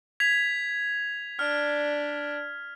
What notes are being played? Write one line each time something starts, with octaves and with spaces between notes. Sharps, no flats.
G#6 B6 F7
D4 F6